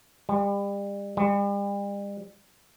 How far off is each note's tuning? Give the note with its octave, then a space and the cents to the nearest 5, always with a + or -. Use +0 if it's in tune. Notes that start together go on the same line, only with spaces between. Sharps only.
G3 +35
G3 +40